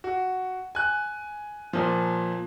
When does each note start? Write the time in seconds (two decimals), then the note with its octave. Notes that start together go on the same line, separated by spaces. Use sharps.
0.04 F#4
0.75 G#5 F#6
1.73 A#2 F3